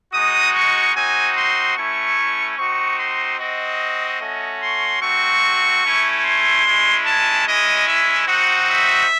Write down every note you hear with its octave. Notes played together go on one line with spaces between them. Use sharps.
G#3 D#4 F#4 D#6
C#6
C4 D#4 F#4 G#5
C6
A3 C#4 E4 C#6
C4 D#4 F#4 C#6
C6
C4 F#4 D#5
A3 C#4 F#4
C6
A3 C4 F#4 C#6
A3 C#4 E4
C6
G#3 C#4 E4
A5
G#3 C#4 E4 D#5
E5
C4 D#4 F#4 F#5
E5